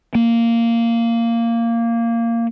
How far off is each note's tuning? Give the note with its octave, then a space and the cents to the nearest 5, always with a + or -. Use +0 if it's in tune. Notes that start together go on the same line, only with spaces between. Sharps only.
A#3 -10